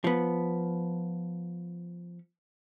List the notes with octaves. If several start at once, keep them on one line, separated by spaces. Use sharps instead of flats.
F3 B3